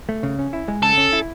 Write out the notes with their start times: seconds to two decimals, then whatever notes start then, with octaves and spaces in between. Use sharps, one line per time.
0.09 A3
0.23 C#3
0.39 C#4
0.53 E4
0.68 G#3
0.83 C#3 A4
0.98 C#4
1.13 E4